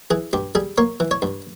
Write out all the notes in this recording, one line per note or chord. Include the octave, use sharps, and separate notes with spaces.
E3 G#4
G2 G4
G3 G#4
A#3 C#5
E3
C#5
G2